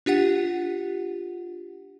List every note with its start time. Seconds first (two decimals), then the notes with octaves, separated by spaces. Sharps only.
0.06 D4 F4 G4 F#5